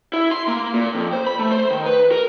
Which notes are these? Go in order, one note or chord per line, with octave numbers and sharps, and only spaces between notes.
E4
C6
A#3
A#2
F2
C5
B5
A3
C5
D#3
B4
A#4